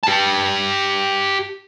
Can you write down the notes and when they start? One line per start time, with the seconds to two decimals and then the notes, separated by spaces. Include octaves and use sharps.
0.03 G4 A5